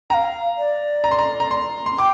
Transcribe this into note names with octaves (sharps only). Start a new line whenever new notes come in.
F5 G5 A#5
D5
A#5
C6
A#5
A#5
C6
C6
G5 D6